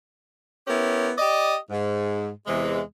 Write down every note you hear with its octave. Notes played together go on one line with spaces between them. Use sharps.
B3 C#4 E4 G4 A#4
G4 D5 D#5
G#2
E2 C3 E3 G#3